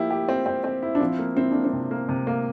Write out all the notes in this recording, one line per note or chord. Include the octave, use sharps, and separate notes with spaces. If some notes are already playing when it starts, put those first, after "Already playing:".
Already playing: F3 A#3 E4 G4
G4
C4
C4
C4
E4
D4
F3 C4
A#3
C4 E4
A#3 D4
C4
C3
A#3
C3
A#3